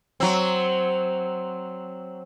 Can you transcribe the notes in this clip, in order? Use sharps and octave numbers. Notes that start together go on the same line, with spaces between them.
F#3 C4